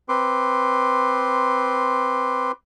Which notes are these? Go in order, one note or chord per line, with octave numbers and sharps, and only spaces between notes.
C4 B4 C6 D6